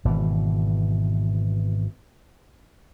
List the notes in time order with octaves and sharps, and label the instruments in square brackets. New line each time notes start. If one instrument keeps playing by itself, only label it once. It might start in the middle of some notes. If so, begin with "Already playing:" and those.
[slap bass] G#1 B2 E3